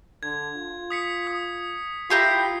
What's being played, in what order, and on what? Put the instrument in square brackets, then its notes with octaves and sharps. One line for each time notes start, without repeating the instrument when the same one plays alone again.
[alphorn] D3 [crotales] G#6
[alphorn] F4
[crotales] D#6 B6 C#7
D#6
[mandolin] E4 G4 A#5 [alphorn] F4 [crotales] C7